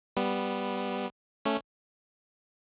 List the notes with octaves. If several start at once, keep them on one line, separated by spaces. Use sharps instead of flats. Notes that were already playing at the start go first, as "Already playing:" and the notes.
G3 B3
A3 C#4